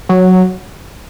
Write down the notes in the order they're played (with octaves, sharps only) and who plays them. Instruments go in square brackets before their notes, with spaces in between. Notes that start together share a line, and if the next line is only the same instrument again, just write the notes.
[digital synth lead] F#3